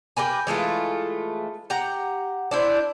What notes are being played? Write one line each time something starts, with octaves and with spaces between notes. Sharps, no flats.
G4 A#4 B4 G#5
E3 G#3 A3 F4
G4 F#5 A#5
D4 E4 C5